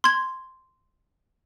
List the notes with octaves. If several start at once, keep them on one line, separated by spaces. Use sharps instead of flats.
C6 G#6